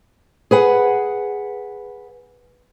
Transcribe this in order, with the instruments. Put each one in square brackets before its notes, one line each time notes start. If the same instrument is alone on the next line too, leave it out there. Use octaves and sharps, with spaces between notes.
[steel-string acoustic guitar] G#4 B4 F#5